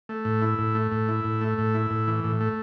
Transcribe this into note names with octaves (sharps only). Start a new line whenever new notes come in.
A3
A2
E4
A2
A3
A2
E4
A2
A3
A2
E4
A2
E3
A2
A3